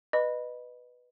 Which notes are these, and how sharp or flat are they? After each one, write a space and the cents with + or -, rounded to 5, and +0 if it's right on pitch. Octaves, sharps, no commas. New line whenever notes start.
B4 +0 D#5 -20 B5 -10